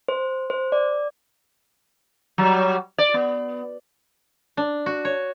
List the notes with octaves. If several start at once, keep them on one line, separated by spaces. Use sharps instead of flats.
C5
C5
D5
F#3 G3
D5
B3
D4
F#4
C#5